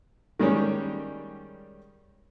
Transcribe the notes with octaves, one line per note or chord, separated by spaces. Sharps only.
D#3 G3 G#3 C#4